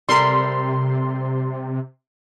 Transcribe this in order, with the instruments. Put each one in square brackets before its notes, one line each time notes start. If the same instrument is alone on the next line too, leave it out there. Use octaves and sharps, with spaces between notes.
[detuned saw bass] C3 [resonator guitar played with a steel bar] G3 A4 A#4 [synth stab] C6